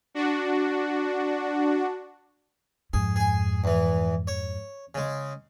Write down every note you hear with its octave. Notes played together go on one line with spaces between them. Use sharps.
D4 F#4
F2 G#2 G#4
G#4 G#5
E2 E3
C#5
C#3 G#3